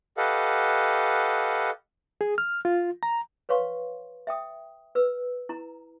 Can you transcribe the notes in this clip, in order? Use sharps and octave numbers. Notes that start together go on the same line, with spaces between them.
G4 A4 B4 D#5 F5 F#5
G#4
F6
F4
A#5
B4 C#5 F5 C6 C#6
E5 G5 D#6
B4 E6
E4 A#5